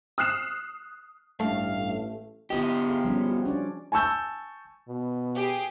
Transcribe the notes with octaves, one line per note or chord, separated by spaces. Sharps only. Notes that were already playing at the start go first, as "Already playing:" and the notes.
D#6 F6 F#6 C7 E7
A1 G2 A3 F5
B3 E4 F4 G4 D#5
G#4 F5
F3 G3 C#4
F#4
C#4 D4 D5
G#5 A5 C#6 E6 G6
B2
G4 G#4